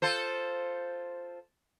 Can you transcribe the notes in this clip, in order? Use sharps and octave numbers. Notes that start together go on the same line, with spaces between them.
F4 A4 C5